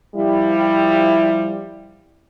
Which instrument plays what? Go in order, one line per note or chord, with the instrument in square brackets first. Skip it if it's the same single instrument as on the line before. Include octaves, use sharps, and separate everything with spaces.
[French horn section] F3 G3 E4